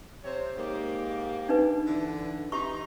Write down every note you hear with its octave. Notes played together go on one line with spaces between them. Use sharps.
C3 C5 C#5
G#2 A#3 G4
D4 D#4 B4
D3 E3
E3 D#4 G4 A#5 C#6